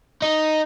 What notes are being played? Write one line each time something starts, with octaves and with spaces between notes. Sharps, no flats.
D#4